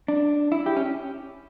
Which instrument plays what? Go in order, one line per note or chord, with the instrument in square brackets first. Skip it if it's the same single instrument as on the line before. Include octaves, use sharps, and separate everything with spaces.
[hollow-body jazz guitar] D4
E4
G4
C#4